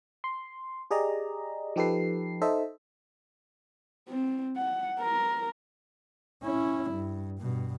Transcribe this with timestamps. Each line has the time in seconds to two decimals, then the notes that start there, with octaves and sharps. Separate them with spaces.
0.24 C6
0.91 G4 G#4 D5 D#5 A#5
1.76 F3 D#4 G4 A4 B4 C7
2.42 D#4 A4 C5 D#5 E5
4.08 C4
4.56 F#5
5.00 A#4
6.44 C#4 E4
6.91 G2
7.41 G2 B2